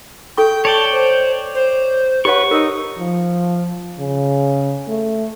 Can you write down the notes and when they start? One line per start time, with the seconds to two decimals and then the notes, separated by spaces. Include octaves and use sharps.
0.37 A4 G5 C#6
0.65 C#5 D5 G5 A5
0.93 C5
1.55 C5
2.25 G4 B4 C#5 F#5 C#6
2.51 D#4 A#4
2.98 F3
3.98 C#3
4.88 A3